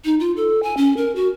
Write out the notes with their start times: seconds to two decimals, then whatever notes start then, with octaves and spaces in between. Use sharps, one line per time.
0.05 D#4
0.20 F4
0.37 A4
0.63 G#5
0.77 C#4
0.97 A#4
1.16 F#4